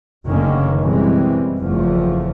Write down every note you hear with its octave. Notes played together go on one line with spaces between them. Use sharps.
F#1 D3 D#3 A3 A#3 C#4
F#2 B2 E3 G3 G#3 C4
F#1 E2 F3 A3